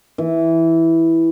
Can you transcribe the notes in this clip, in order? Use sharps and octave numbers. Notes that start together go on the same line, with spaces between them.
E3